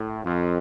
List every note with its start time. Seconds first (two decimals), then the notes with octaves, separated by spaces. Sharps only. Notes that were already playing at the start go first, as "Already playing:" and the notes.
Already playing: A2
0.24 F2